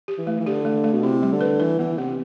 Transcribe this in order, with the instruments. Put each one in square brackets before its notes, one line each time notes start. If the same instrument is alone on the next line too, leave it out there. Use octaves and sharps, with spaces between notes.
[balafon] G4
[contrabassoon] E3
[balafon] A3
[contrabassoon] E3
[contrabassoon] D3 [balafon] G4
[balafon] A3
A3
[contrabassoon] B2
[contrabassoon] C3 [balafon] E4
[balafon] G3
[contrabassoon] D3
[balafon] B4
[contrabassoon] E3 [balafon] B4
[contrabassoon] E3 [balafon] B3
[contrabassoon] C3 [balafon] B3